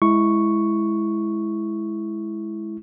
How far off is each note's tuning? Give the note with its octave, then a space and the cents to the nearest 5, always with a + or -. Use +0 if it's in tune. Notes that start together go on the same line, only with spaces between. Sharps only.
G#3 +15 E4 +0 C#6 +0